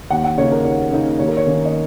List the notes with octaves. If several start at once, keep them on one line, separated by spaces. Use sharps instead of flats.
D#2 F#5
F#5
C#3 A#3 D#4 C#5
A#4
D#2 C#5
C#3 A#3 D#4
D#2 C#5
A#4
C#5
D#3 A#3 C#4
D#5